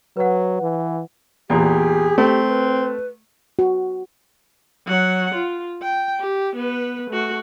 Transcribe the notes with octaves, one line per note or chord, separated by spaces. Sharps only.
F#3 B4 F#5
E3
E2 A#2 G4 G#4
A3 C4
B4
F#4
F#3 F#5
F4
G5
G4
B3 B4
A3 F#4